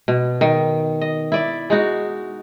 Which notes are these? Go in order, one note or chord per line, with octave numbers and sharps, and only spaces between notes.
B2
D#3
D#5
E4 D5
G#3 D#4 F#4